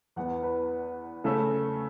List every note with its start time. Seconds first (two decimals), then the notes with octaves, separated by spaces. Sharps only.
0.16 E2 E3 B3 F#5
0.43 B4
1.24 C#3 A3 C#4 A4